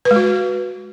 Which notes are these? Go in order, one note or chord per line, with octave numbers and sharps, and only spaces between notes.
B4
G#3
F#4